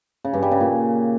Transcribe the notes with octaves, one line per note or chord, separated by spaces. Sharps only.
C#3
G2
G3
C#3
A#2